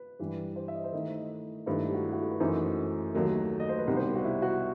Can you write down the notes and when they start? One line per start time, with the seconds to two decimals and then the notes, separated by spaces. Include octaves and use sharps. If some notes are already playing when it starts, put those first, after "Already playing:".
Already playing: B4
0.19 G2 E3 G3
0.56 C5
0.68 E5
0.75 D#5
0.84 C5
0.92 D#3 A3 E4 D#5
1.66 G2 D#3 A3 E4 C5
1.85 G4
1.94 F#4
2.04 E4
2.13 F#4
2.22 A4
2.31 B4
2.40 F#2 E3 A3 D#4 F#4 C5
3.14 D#2 D#3 F#3 A3
3.60 D#5
3.69 C5
3.78 B4
3.87 C2 B2 G3 B3 D#4
3.96 C5
4.15 F#4
4.25 E4
4.42 F#4